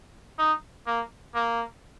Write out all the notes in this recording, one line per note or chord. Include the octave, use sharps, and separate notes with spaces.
D#4
A#3
A#3